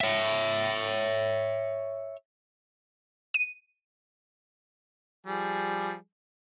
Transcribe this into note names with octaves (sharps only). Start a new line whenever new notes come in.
C#5 E5
D#7
F3 G3 G#4